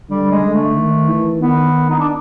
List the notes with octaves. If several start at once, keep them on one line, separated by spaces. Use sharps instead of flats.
D3 G3
G#3
D3
A3
D#3
E3
D#3 B3
D#4
D4